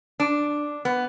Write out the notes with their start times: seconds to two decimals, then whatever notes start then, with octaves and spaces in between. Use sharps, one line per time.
0.20 D4
0.85 B3